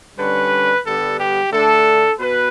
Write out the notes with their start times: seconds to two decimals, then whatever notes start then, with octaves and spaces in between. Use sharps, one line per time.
0.18 D3 G3 C#4 B4
0.85 G2 D3 G3 B3 A4
1.18 G4
1.52 D3 A3 D4 A4
2.19 B2 B4